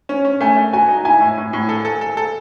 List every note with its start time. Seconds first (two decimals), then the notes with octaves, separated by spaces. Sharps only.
0.09 C#4
0.25 C#4
0.41 A3 G#5
0.56 A3
0.73 F#4 G#5
0.89 D#4
1.05 E4 G#5
1.21 A2
1.38 A2
1.53 A2
1.69 A4
1.85 A4
2.01 A4
2.17 A4